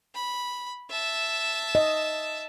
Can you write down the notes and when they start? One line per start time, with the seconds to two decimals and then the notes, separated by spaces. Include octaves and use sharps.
0.15 B5
0.91 E5 A5
1.75 D#5